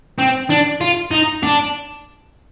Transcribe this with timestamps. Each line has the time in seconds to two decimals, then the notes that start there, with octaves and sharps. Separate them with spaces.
0.18 C4
0.49 D4
0.81 F4
1.11 D#4
1.43 D4